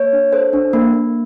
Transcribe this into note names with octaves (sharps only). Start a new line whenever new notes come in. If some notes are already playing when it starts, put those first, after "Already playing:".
Already playing: A#3 C#5
D4
A4 C5
D4
A#3
A#3